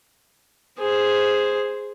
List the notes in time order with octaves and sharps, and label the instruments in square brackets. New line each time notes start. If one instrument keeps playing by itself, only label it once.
[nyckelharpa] G#4 C5